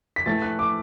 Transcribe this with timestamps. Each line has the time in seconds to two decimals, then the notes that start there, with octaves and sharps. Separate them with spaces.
0.16 B6
0.26 A2 E3 A3 A6
0.42 F#6
0.59 D6